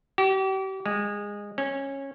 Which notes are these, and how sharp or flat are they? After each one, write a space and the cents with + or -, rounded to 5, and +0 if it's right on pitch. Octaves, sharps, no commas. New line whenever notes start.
G4 -40
G#3 -20
C#4 -15